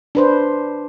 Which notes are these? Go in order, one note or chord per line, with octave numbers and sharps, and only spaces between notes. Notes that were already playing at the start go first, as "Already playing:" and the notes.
D4 B4 C5